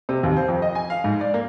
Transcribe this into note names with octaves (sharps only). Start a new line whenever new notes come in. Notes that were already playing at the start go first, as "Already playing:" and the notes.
C3
D#2
C5
F2
D#5
G#5
F5
G#2
D5
A#3